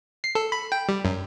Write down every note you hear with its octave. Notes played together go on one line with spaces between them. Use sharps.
C7
A4
B5
G5
G3
F#2